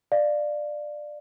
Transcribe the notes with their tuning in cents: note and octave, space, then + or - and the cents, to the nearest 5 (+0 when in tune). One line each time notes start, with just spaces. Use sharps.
D5 +15 F5 +0